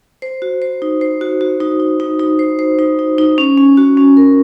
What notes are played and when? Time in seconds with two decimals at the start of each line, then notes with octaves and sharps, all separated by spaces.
0.22 C5
0.42 F#4
0.62 C5
0.82 D#4
1.01 C5
1.21 F#4
1.41 F#4
1.60 D#4
1.80 D#4
2.00 D#4
2.19 D#4
2.39 C5
2.59 C5
2.79 D#4
2.99 D#4
3.18 D#4
3.38 C#4
3.58 C#4
3.77 F#4
3.97 C#4
4.17 A#4